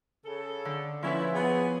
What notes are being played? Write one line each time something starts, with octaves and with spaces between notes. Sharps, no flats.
C#3 G#4 A4
D3
F3 C#4 E4 B4
B3 G#4